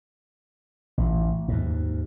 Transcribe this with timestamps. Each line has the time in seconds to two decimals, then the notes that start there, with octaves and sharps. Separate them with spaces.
0.98 A1
1.48 D#2 G#2